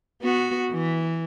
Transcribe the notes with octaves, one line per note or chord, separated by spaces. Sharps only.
B3 F#4
E3